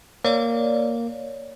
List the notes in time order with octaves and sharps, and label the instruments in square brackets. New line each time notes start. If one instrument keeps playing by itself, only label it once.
[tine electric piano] A#3 [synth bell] C#5 D5